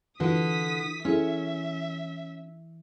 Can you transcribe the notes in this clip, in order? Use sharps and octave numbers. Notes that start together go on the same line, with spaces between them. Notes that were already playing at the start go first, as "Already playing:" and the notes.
D3 E3 F4 F#4 B4 D#6 B6
C#4 E4 G#4 A4 E5